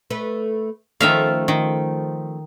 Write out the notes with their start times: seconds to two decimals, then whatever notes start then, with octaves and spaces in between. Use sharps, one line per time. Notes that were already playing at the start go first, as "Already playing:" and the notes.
0.10 A3 B4
1.01 D#3 F3 A3 C#4 E5 F5
1.48 D#3